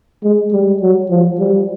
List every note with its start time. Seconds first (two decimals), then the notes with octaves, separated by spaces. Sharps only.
0.23 G#3
0.53 G3
0.82 F#3
1.10 F3
1.39 G3